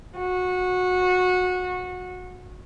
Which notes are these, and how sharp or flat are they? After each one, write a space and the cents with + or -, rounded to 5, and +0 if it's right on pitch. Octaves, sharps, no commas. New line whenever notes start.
F#4 -20